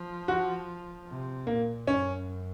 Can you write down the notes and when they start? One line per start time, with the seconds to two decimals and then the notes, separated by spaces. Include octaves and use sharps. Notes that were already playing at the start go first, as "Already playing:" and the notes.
Already playing: F3
0.28 F#4
1.08 C3
1.47 A#2 A#3
1.87 F#2 C#4